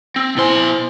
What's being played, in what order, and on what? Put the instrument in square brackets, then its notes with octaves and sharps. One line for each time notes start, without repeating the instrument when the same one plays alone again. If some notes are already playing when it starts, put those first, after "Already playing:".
[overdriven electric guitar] C4
[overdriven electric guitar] B2 C6 [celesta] E4 C5 G#5